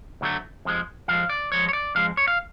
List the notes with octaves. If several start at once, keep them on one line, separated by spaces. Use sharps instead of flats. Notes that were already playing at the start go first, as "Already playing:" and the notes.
D2 D3 F#3 A3
F2 F3 G#3
F2 F3 G#3 F5
D5
F2 F3 G#3 C#5
C#5
D5
F2 F3 G#3 F5
C#5
F5